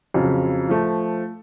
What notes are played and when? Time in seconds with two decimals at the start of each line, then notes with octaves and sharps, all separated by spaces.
0.14 F2 C#3 F#3
0.69 F3 A3